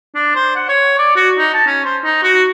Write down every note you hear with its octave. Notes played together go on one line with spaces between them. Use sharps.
D4
C5
F#5
C#5
D5
F#4
D#4
A5
C#4
C5
D#4
F#4